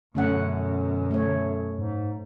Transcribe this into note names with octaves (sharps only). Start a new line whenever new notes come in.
F#2 B2 D3 A3 C#4 F#5
A3 C#5
G#2